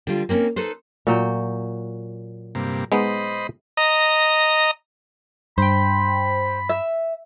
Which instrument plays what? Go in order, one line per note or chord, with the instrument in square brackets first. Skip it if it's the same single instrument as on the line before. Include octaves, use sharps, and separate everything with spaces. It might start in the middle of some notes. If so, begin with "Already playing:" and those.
[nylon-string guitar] D3 G3 F4
A#3 C4 C#4 D#4
D#4 A4 B4 C5
[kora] A#2 F#3 G5
[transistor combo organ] G2 C3 A#3
[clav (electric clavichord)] G#3 B3 D#4 [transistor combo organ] C5 D#5 B5
[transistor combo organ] D#5 A#5
[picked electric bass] G2 [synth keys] C5 G5 [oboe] B5
[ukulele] E5